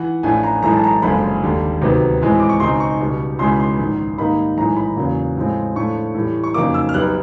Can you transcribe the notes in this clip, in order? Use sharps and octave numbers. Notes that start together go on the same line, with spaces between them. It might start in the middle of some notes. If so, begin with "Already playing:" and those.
Already playing: E3 F#5
A1 A2 F3 A3 D4 G#5
A#5
B1 A2 E3 G#3 A#5
A5
A#5
F#1 F#2 D3 F3 G#3 B5
D#2 D3 G3
D2 C3 D#3 F#3 B3
A2 E3 G#3 C4
D6
C#6
C#2 B2 G#3 C4 D#4 C6
C#6
C#2 B2 G3
C#2 B2 G#3 C#4 E4 C6
B5
C6
A#1 G#2 D#3
G#2 D#3 G3 A#3 D#4 B5
B1 A2 E3 G#3 A#5
B5
E2 C#3 F#3 A#3
A2 F3 G#3 C4
A2 F3 A3 D4 C#6
A2 E3 G3
C#6
F2 C#3 F#3 A#3 D#4 D6
E6
F6
B1 B2 G3 B3 D#4 F#6